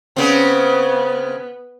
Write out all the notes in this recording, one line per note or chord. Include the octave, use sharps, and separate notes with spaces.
C#3 B3 C4